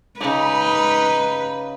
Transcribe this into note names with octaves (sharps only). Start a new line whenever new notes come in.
C#3 D#4 B4 D6